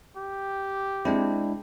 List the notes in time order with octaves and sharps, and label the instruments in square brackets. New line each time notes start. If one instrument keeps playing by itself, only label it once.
[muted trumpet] G4
[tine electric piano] G#3 D4 E4 [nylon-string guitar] C4